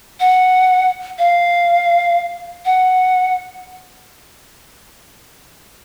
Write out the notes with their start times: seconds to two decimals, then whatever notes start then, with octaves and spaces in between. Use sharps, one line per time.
0.20 F#5
1.19 F5
2.66 F#5